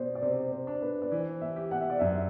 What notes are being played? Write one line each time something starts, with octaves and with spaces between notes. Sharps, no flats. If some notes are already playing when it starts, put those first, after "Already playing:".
Already playing: B2 C5 D5
D5
C3 C5
C5
D4
B4
D5
E3 C5
E5
G4
F#5
E5
D5
F#2 E5